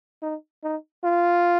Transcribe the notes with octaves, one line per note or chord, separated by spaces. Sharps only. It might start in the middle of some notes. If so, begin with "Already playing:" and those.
D#4
D#4
F4